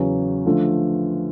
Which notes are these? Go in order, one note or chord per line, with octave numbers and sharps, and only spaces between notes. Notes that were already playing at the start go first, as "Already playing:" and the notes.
Already playing: E2 C#3 F#3
D3 F3 A3